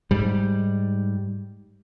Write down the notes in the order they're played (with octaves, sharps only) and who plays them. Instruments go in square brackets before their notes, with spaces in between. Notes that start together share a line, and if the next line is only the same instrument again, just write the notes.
[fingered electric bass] G#2 G3